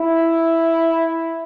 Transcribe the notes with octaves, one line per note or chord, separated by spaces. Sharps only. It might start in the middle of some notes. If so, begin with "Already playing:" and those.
Already playing: E4